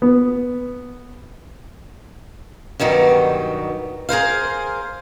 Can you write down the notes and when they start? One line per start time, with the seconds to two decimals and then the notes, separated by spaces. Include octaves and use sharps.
0.02 B3
2.80 G2 B2 D#3 F#3 G3
4.09 G#4 A#4 C5 F5